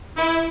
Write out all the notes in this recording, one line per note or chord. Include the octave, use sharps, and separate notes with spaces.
E4